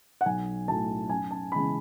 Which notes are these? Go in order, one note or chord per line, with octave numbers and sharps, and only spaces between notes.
F#5
B1 G#5
A2 F#3 A3 A5
F#2 G#5
A5
C#3 E3 G#3 B3 B5